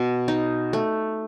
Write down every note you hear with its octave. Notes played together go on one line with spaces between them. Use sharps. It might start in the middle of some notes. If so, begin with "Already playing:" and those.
Already playing: B2
D#4
A3